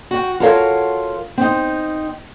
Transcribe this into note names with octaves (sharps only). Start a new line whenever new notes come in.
F#4 G5
F4 F#4 A4 A#4 C#5 F5
C4 D#4